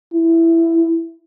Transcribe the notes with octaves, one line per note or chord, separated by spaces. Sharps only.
E4